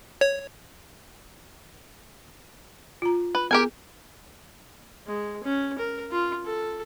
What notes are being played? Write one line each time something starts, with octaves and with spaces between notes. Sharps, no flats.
C#5
F4 A#5
B4
B3 G4 G#4 A#4 G#5
G#3
C#4
A#4
F4
A4